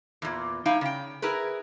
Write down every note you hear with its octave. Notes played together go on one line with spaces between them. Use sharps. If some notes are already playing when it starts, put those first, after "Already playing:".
E2 A#2
G3 D#4 E4 F5 G5
C#3 G5
E4 G#4 A#4 B4